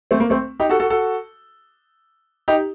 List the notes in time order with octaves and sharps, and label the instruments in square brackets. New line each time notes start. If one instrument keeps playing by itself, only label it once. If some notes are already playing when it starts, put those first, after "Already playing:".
[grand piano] A3 C4
A#3
A3 C4
D#4 G4
F#4 A4
F#4 A4
F#4 A4
D#4 G4